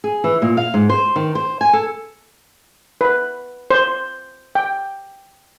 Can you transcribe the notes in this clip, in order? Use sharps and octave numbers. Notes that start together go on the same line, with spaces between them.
G#4
E3
A#2
F5
G#2
C5
D#3
C5
G#5
A4
B4
C5
G5